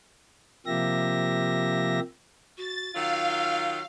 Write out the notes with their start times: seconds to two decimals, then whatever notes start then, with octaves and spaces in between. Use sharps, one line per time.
0.66 C3 F3 A#3 G4 E5 A#6
2.58 F#4 A6
2.95 D#3 F#3 F4 F5 E6